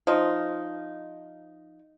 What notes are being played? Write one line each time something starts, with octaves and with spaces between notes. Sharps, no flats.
F3 D#4